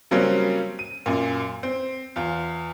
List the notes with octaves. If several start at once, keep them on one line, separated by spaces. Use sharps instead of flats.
C#3 F#3 G3 A#3 C4 C#4
D#7
F#2 A#2
C4
E2 F4